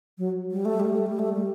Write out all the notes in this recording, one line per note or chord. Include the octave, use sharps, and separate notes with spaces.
F#3
G3
A3
G3
A3
G3
A3
G3